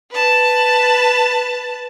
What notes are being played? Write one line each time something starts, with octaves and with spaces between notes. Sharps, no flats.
B4 A5